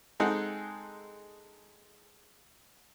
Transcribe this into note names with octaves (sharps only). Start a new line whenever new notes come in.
G#3 C4 D#4 G#4 A4 F#5